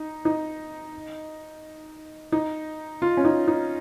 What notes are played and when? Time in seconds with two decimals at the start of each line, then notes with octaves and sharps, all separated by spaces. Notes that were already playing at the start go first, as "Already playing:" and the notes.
Already playing: D#4
0.25 D#4
2.32 D#4
3.02 F4
3.17 C#4
3.25 D#4
3.48 D#4